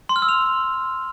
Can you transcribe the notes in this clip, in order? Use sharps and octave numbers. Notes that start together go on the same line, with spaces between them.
C6
F6
E6
F7